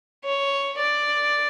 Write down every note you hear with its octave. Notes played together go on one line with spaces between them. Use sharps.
C#5
D5